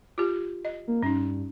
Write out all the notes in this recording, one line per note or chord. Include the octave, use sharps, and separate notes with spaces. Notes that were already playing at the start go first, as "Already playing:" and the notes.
F4 G4
D#5
A#3
G2 C#4 D#4